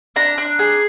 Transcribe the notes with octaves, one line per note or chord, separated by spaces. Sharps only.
D4 A#5
D4
G#4